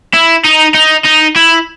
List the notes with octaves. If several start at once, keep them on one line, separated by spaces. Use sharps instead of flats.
E4
D#4
D#4
D#4
E4